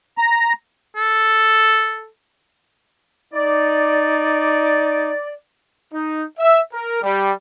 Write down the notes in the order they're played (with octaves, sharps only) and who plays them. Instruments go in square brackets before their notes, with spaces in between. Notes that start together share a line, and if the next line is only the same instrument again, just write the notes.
[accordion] A#5
[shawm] A4
[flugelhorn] D#4 [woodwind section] D5
[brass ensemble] D#4
E5
A#4
G3